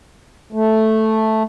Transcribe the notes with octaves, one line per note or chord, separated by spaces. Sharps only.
A3